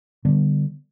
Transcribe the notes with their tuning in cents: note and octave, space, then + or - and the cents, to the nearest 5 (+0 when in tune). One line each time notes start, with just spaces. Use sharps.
D3 +0 G3 +0 B3 +0